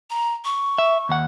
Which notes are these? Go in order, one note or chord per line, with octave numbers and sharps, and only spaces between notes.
A#5
C#6
E5
D#2 F#5